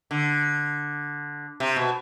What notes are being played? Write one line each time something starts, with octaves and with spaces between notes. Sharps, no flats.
D3
C3
B2